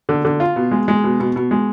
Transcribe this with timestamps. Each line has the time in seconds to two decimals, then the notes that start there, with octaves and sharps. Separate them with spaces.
0.09 D3
0.25 D3
0.40 F4
0.56 B2
0.71 G#3
0.88 G#3
1.04 B2
1.20 B2
1.36 B2
1.51 G#3